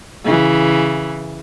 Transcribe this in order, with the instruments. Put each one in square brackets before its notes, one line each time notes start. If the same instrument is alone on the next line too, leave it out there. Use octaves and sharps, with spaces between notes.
[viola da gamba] C#3 E3